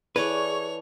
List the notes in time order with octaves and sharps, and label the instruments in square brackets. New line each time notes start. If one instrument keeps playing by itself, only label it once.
[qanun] E3 A4 D5 [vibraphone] G#4 C#6 [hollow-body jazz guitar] B4 [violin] C#5 F7